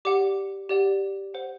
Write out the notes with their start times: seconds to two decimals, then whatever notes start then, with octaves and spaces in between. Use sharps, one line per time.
0.05 G4 D5 F#5 D6
0.69 G4 D5 F#5
1.34 C5 F#5